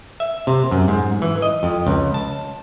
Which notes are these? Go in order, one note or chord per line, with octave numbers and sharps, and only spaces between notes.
E5
C3
F#2
G#2
E3
D#5
F2
C#2
A5